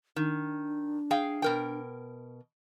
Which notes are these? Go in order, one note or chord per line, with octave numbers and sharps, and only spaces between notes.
D#3 D4
G#4 F5 G5
B2 A#4 G5